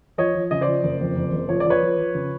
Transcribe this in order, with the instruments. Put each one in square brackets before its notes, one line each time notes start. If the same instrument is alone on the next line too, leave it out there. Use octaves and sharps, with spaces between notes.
[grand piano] F3 C#5 D#5
F3
C#3 D#5
C5 D5
F3
F#1
F2
F#1
F#1
F3 C#5
D5
F3 B4 C#5
F3
F3
C#3